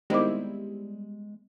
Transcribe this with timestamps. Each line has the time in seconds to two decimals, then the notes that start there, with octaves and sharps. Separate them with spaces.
0.10 D#3 G3 G#3 B3 C4 E4 D#5 D6